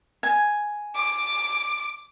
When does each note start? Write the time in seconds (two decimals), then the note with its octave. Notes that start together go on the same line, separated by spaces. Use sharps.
0.23 G#5
0.95 D6